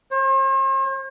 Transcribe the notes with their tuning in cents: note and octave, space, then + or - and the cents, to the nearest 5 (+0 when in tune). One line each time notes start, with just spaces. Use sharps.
C5 +45